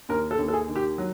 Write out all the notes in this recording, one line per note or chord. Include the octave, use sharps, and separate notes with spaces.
D#2 A#4
A4
D#2
A4
G#4
D#3
G4
F#3